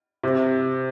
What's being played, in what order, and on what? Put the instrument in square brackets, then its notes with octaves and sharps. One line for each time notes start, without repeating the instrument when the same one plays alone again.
[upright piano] C3